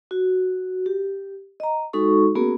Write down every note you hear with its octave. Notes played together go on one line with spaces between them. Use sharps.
F#4
G4
D#5 A#5
G#3 D#4 F#4 A4 C#6
A#3 B3 C#4 F#4 G#4 A#4